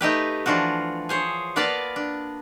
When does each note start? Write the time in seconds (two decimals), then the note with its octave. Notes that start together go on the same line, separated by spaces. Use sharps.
0.01 A3 D#4 G4 B4
0.46 E3 F3 D4 F4 F#4
1.09 G#4 C5 C#5
1.56 A#3 B3 B4 D5 F5 A5
1.96 D4